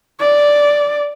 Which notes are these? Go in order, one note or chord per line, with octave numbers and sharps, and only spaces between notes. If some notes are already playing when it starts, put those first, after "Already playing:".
D5